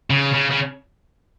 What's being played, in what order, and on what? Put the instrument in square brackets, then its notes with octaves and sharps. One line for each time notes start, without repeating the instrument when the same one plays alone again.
[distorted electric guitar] C#3
C#3
C#3